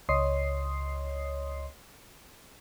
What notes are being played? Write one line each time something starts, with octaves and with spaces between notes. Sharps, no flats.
C#2 C#5 D#5 C6 D#6 C7